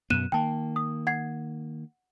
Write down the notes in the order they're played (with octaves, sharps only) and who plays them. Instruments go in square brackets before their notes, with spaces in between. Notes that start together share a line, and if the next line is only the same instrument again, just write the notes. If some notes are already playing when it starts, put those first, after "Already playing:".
[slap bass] F#2 B2 B3 [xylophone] F#6 D#7 E7
[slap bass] D#3 A#3 [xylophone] G5 A5
[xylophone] D#6
F#5 G#6 C7